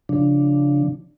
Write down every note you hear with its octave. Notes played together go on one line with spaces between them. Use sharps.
C#3 F3 D4